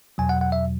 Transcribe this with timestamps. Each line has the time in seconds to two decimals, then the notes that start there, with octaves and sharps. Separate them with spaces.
0.18 E2 B2 F#3 G#5
0.29 F#5
0.41 F#5
0.52 E5